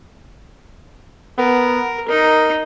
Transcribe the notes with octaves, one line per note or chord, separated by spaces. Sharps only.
B3 A#4
D#4 A#4